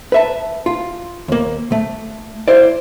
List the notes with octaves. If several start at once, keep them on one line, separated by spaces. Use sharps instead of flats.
B4 E5 A5
F4
D#2 A#3
A3
E4 C5 D5